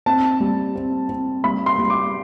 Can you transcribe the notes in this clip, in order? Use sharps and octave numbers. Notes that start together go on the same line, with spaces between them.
C4 A5
G3
C4
C4
G3 B5
C6
G3
D6